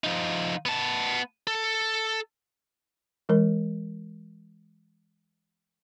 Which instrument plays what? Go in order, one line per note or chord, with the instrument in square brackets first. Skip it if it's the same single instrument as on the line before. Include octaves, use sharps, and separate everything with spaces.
[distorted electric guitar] F3 D#4
B3 A5
A4
[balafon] E3 G#3 A#4